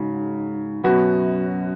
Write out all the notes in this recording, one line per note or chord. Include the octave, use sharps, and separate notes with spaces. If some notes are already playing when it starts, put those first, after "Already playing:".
Already playing: G#2 C#3 F#3
F#2 B2 B3 F#4